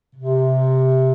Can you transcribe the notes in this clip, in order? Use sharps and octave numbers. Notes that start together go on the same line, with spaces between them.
C3